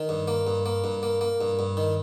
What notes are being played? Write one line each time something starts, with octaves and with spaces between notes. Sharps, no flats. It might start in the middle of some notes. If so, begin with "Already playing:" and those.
Already playing: D#3
G2
A#3
G2
A#3
G2
A#3
A#3
G2
G2
D#3